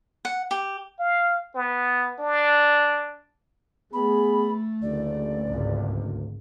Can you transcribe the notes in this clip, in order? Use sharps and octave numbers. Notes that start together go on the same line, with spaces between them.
F#5
G4
F5
B3
D4
A3 B3 G#4 B5
F#1 D2 D5
G#1 C#2